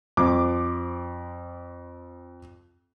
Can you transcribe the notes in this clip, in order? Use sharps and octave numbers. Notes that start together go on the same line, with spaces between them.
F2 C4 D6